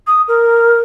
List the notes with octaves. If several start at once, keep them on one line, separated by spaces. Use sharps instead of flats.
D#6
A#4